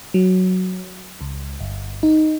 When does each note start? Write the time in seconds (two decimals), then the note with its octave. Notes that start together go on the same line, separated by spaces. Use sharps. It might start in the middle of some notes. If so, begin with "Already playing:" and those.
0.14 F#3
1.21 C#2
1.60 G1
2.03 D#4